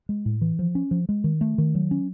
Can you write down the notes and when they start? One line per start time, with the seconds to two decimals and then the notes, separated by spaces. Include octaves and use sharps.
0.09 G#3
0.26 A2
0.41 E3
0.59 F3
0.75 C#4
0.91 F3
1.09 G#3
1.24 D#3
1.41 A3
1.58 D#3
1.75 F#3
1.91 C#4